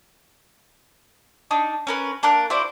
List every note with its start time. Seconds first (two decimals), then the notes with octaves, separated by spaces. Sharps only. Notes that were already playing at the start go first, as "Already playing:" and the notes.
1.51 D4 D#4
1.87 C#4 A#4 B4
2.23 A#3 D4 A#4 F#6
2.50 E4 F#4 C5 D5